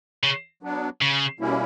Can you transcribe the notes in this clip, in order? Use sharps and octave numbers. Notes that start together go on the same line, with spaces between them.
C#3
F#3 B3 D4
C#3
B2 G3 A#3 C#4 E4